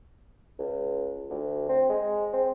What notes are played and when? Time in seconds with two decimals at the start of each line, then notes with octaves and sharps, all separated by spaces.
0.59 C#2
1.30 D2
1.69 C4
1.89 G#3
2.34 C4